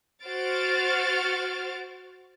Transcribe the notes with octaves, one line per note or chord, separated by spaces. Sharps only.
F#4 C5 F6 A6 D7